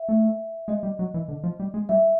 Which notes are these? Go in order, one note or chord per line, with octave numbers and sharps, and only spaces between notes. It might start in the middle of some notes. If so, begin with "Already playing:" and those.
Already playing: E5
A3
G#3 D#5
G3
F#3
E3
D3
F3
G3
G#3
G3 E5